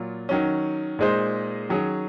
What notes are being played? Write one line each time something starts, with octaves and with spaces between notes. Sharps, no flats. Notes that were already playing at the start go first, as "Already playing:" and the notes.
Already playing: A#2 F#3 F4
D#3 F#3 C#4
A#2 G#3 D#4 G#4 C5
D#3 F#3 C#4 G#4